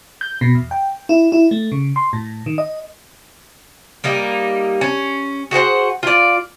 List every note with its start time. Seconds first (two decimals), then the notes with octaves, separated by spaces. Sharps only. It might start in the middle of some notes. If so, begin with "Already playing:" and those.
0.21 G6
0.41 B2
0.55 E2
0.71 G5
1.09 E4
1.32 E4
1.51 A3
1.72 C#3
1.96 C6
2.13 A2
2.46 D#3
2.58 D#5
4.04 G3 A#3 D#4
4.81 C#4
5.51 F#4 G#4 C5 F#5
6.03 F4 D5